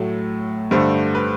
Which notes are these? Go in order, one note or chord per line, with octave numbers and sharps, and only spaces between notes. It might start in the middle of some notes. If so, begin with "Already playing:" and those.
Already playing: A2 F#3 A3
G2 D3 A3 A4 C5
B4